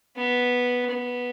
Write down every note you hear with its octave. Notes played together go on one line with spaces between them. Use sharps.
B3
B3